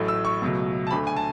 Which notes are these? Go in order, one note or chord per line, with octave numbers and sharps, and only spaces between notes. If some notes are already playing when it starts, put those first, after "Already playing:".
Already playing: A1 A2 F#3 A3
E6
C#6
C#2 B2 F#3 A3
A5
D2 D3 A3 B5
G#5
A5